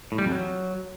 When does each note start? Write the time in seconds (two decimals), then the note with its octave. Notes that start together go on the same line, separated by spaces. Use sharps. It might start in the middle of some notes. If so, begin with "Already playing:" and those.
0.12 A2
0.18 G3
0.25 F2
0.31 F#3